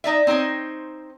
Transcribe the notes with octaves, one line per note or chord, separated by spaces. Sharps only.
D#4 D5 E5
C4 D#4 C5 C#5